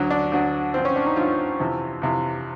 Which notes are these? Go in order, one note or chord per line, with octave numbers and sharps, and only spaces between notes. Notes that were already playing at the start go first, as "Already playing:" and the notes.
Already playing: D2 D3 F#3
D4
D2 D3 F#3
G2 D3 F3 C4
C#4
D4
D#4
G2 D3 F3 F4
F2 C3 E3
F2 C3 E3